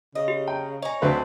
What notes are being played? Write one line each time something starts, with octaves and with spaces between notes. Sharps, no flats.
C#3 D#5
G4
G5 A#5
C#5 D#5 G#5 A#5
D2 C4 B4 C6